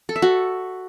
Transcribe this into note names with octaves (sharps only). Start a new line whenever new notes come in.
A4
E5
F#4